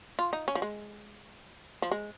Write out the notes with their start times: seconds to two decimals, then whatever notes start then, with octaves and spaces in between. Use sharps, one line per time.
0.19 F4
0.33 D#4
0.48 C#4
0.55 F3
0.62 G#3
1.82 F3
1.92 G#3